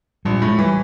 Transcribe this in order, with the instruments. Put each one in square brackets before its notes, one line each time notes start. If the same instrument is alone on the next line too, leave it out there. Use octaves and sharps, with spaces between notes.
[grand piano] A#1 [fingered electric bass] G3
[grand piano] A2 [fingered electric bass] G#3
[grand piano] E3 [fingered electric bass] G3